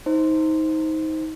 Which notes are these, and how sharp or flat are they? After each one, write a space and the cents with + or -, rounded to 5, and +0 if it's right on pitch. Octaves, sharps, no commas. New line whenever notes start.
D#4 +25 C5 +0